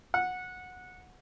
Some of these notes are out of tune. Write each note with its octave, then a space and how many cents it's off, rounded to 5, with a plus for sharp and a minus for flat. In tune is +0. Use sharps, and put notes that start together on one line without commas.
F#5 -15